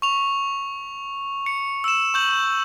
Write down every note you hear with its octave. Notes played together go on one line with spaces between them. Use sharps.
C#6 F7
C#7
E6 E7
C#6 G6 F#7